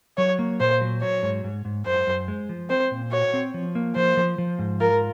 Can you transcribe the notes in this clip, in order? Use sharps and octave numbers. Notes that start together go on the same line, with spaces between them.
F#3 C#5
A#3
A#2 C5
F#3
F#3 C#5
G#2
G#2
G#2
F#2 C5
F#2
G#3
F3
C4 C5
A#2
F#4 C#5
C4
F3
A#3
F3 C5
F3
F3
G#2
F4 A#4